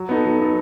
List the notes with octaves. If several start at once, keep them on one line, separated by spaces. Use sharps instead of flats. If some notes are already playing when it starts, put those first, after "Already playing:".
Already playing: F#3
B3 D#4 A4
F#3
B3 D#4 A4